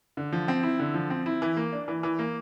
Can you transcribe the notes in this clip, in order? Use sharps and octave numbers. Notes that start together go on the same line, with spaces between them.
D3
F3
C4
E4
D3
F3
C4
E4
E3
A#3
D4
E3
E3
A#3